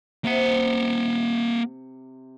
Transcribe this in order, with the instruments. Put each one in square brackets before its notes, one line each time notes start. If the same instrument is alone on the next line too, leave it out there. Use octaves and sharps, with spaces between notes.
[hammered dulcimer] C3 [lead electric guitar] A#3 F#5